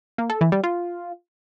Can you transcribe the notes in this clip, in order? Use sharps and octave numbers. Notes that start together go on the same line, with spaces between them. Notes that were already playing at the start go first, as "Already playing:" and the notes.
A#3
A4
E3
G3
F4